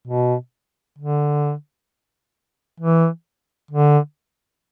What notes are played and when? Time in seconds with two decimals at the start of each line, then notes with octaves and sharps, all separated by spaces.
0.07 B2
0.98 D3
2.80 E3
3.71 D3